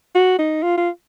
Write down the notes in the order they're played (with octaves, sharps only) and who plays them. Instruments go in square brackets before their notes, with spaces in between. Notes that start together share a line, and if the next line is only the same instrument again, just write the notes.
[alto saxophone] F#4
D#4
F4
F4